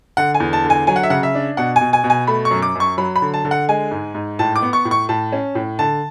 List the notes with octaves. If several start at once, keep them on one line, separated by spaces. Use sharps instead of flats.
D3 F#5
G#5
E2
A5
D3
G#5
F#3 G#5
F#5
E5
C#3 F#5
E5
D4
B2 F#5
G#5
B2
G#5
B2
G#5
A3 B5
C#6
F#2
D6
F#2 C#6
F#3 B5
B5
D3
A5
D3
F#5
G#3 G#5
G#2
G#2
A2 A5
D6
B3
C#6
A2
C#6
A2 A5
C#4
A2
D3 A5